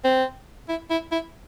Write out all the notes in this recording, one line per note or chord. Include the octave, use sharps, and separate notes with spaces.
C4
E4
E4
E4